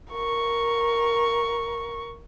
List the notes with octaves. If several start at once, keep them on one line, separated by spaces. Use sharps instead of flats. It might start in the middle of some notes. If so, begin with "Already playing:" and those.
A#4 C#6